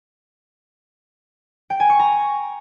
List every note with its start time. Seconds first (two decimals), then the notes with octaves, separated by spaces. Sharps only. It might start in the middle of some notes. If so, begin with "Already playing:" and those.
1.70 G5
1.80 G#5
1.90 C#6
2.00 A#5